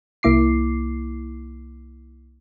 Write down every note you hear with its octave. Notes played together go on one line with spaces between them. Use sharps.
C2 A#3 E4 D6 C7